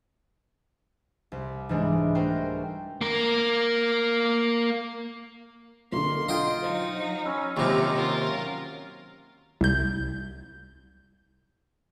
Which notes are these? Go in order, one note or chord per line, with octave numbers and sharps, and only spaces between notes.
C2
G#2 E3 G#3 D4
A3 F#4 A#4 C5 G5
A#3 A#4
B1 D3 A#3 C6
F4 D#5 G5
F#3 D#4 C5
C#4 B5 E6 F6
D#2 C3 F#3 D#4 F4 G4 D6 A#6
F#3 C#4 F4 A#4
C2 G6